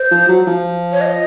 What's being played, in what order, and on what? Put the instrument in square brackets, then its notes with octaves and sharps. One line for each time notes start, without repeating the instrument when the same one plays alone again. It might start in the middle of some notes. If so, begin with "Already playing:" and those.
Already playing: [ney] C5
[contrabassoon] F3
F#3
F3
[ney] C#5
D#5